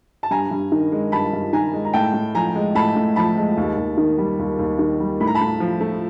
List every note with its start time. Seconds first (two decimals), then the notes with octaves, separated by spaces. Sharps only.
0.23 A5
0.31 G2 G#5 A#5
0.51 G2
0.72 D#3
0.92 G#3
1.12 G2 A5 B5
1.33 G2
1.53 D#3 G#5 A#5
1.73 G#3
1.85 A#5
1.94 A2 G5 A5
2.14 A2
2.35 F3 G#5 A#5
2.56 G#3
2.75 A2 A5 B5
2.96 A2
3.16 F3 A5 B5
3.37 G#3
3.57 D#2
3.77 D#2
3.97 D#3
4.18 G3
4.39 D#2
4.59 D#2
4.79 D#3
5.00 G3
5.20 A2 B5
5.27 A#5
5.35 A5 B5
5.41 A2
5.60 F3
5.81 A3